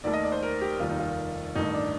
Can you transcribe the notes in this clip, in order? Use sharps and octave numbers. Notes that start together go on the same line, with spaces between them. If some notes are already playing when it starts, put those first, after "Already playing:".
D#2 D#3 A3 D5
D#5
D5
C5
A#4
G4
F1 D#2 D#3 G3 F4
D#4
F4
A1 G2 D#3 A3 D#4
D4